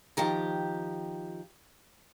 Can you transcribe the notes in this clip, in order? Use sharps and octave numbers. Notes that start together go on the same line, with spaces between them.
D#3 F3 G4 A#5